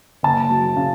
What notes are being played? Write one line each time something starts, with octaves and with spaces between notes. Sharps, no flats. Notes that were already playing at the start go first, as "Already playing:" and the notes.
F#1 A5
F#3
C#3